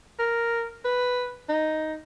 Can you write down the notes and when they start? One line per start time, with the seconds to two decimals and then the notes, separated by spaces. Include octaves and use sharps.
0.19 A#4
0.84 B4
1.49 D#4